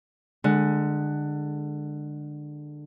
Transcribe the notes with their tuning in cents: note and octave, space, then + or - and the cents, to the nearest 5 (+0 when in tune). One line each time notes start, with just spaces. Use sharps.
D3 +20 G#3 +0